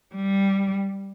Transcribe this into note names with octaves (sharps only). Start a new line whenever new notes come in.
G3